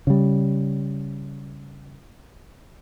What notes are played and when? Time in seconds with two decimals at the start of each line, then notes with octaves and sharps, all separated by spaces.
0.07 C#3 G3